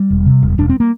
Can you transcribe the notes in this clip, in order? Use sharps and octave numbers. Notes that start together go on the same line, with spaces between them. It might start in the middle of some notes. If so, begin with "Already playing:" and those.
Already playing: G3
E1
C3
E1
E1 D4
C4
A#3